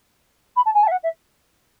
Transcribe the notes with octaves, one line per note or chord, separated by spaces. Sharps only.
B5
A5
G#5
A5
E5
F#5
E5